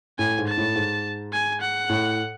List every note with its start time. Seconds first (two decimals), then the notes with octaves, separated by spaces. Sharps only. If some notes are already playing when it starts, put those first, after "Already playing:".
0.19 A2 G#5
0.39 G#2
0.47 A5
0.58 A2
0.76 G#2
1.33 G#5
1.61 F#5
1.89 A2